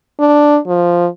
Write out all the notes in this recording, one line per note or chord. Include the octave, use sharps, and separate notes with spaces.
D4
F3